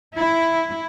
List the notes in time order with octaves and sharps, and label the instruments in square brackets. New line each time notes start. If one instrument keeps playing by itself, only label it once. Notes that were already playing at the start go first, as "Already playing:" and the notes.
[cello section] E4